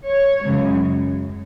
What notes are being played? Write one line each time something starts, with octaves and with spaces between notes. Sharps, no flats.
C#5
F#2 C#3 G#3